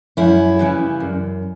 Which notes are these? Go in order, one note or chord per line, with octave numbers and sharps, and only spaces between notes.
F#2 C#4 E4
C#3 E3 G3
F#2